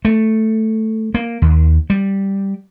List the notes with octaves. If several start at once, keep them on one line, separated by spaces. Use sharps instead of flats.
A3
A#3
D#2
G3